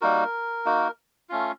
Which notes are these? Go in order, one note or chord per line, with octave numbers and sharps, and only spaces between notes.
G3 A#3 D#4 F#4 A#4
A#3 D#4 F#4
A3 C#4 F4